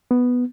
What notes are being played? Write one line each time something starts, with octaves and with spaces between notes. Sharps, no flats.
B3